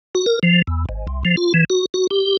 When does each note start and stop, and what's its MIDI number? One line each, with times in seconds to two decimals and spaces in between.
0.15 0.26 66
0.26 0.39 70
0.43 0.62 53
0.67 0.85 40
0.89 1.07 32
1.07 1.23 36
1.25 1.36 53
1.37 1.53 65
1.54 1.64 52
1.70 1.86 66
1.94 2.07 66
2.11 2.37 67